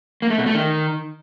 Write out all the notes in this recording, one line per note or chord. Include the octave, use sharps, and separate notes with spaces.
A#3
A3
B2
A3
D#3